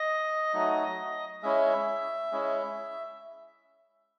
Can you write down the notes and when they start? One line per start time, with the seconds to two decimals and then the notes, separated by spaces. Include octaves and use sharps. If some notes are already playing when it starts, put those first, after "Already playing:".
Already playing: D#5
0.54 F#3 A3 D#4
1.43 G#3 C#4 E4 E5
2.31 G#3 C#4 E4